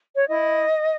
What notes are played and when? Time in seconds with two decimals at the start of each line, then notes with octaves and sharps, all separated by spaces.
0.15 C#5
0.28 E4 D#5